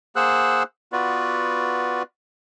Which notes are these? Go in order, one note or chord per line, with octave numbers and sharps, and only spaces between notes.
A#3 G#4 C5 F#5 E6 F#6
B3 F4 F#4 B4 D5